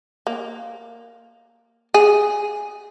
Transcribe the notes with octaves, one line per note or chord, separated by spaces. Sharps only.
A#3
G#4